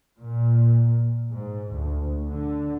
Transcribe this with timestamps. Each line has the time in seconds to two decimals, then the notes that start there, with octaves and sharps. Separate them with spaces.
0.18 A#2
1.31 G#2
1.72 D2
2.28 D3